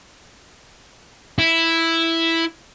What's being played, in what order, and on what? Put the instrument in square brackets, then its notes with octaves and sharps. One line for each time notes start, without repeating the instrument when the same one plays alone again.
[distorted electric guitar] E4